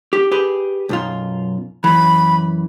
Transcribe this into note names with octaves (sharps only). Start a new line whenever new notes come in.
G4
G4 G#4 B4
B1 F#2 F4
F#2 E3 B5